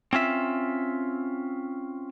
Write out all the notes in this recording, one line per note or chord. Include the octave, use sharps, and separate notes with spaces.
C4 C#4 F4 E5